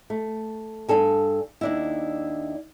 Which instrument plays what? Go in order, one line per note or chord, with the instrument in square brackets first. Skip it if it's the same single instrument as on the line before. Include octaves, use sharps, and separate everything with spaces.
[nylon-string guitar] A3
G2 D4 A4 G#5
D#2 D4 E4